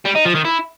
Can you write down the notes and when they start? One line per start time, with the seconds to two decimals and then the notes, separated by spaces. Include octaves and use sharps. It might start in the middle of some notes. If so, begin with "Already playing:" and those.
0.05 G3
0.15 D#4
0.25 F3
0.35 D#3
0.45 E4